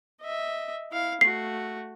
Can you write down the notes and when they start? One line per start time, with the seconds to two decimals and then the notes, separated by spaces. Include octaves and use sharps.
0.21 D#5 E5
0.91 E4 F5
1.21 A3 F#4 C7